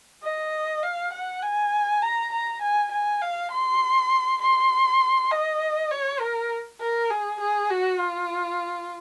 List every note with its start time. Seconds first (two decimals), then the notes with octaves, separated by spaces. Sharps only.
0.23 D#5
0.83 F5
1.13 F#5
1.42 G#5
2.02 A#5
2.32 A#5
2.62 G#5
2.92 G#5
3.22 F5
3.52 C6
4.41 C6
5.31 D#5
5.91 C#5
6.20 A#4
6.81 A#4
7.10 G#4
7.40 G#4
7.70 F#4
8.00 F4